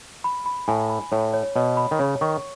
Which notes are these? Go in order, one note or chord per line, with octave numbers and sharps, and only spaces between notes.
B5
B5
A2 G#5
B5
A2 C#5
C#5
B2 C#5
B5
D#3
C#3 C#5
D#3 C#6